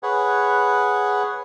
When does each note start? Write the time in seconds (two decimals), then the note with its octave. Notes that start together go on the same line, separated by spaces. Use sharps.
0.03 G#4 B4 C#5 F#5